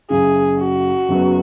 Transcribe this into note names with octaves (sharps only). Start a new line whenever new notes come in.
F#1 F#2 C#3 G#4
F#4
F#1 F#2 F#3 B3